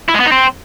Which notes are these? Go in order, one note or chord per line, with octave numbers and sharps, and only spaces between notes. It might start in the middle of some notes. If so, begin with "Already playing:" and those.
E4
G#3
B3
D#4
C4